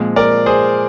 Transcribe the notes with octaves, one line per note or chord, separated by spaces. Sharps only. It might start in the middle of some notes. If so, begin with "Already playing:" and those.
Already playing: A#2 F3 G#3 C4
A#4 D5
G#4 C5